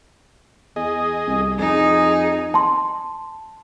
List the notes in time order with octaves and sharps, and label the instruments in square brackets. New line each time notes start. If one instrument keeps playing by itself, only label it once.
[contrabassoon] E2 [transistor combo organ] G#4 D#5
[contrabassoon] C2
[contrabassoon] F2 [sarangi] D#4 [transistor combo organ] G#4
[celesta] A5 C6